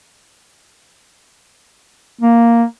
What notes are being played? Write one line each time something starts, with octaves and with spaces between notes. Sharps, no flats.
A#3